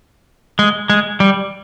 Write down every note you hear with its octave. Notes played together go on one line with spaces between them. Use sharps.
G#3
G#3
G3